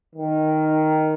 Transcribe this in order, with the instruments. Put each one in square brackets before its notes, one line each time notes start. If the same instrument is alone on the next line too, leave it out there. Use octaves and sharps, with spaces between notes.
[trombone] D#3